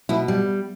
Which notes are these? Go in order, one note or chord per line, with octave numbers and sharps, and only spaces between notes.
B2 E4
G3